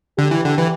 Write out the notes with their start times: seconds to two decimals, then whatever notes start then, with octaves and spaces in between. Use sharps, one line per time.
0.18 D3 G4
0.31 E3
0.45 D3
0.58 E3